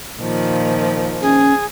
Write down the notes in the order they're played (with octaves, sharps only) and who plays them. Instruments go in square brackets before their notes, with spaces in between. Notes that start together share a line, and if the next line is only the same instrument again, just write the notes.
[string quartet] A#2 D#3 F3
[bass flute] C#4 [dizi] G#4